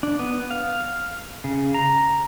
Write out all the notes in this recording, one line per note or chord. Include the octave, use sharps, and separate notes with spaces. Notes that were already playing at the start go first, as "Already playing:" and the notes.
D4
B3
F5
C#3
A#5